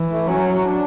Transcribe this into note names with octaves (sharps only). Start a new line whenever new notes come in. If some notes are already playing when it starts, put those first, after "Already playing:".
Already playing: E3
A3
F#3 C#4
D4